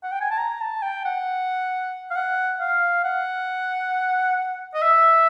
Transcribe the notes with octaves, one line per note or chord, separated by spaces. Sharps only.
F#5
G5
G#5
A5
A#5
A5
G5
F#5
F5
F#5
F5
F#5
D#5
E5